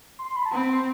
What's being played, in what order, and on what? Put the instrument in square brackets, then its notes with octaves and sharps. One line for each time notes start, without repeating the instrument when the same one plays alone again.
[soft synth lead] C6
B5
A5
[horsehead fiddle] C4 [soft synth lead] B5
[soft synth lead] C6